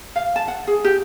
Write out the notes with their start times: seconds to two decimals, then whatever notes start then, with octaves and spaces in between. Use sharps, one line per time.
0.16 F5
0.36 A5
0.48 F#5
0.67 G#4
0.85 G4